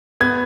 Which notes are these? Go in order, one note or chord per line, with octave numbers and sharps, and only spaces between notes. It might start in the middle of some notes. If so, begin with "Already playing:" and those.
B3 G#6